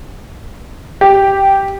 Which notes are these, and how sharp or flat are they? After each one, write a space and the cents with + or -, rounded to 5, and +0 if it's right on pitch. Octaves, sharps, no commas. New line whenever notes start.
G4 -5